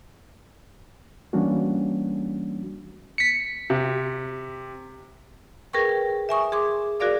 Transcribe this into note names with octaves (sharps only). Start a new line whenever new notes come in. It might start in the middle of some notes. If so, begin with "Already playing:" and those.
E3 G3 A#3 C#4 D4 F#4
B6 C#7
C3
G#4 A#4 B4 G5 C#6
E5 G#5 C#6 D#6
G#4 C6 D6
F#4 G#4 A#4 D5 F5 D6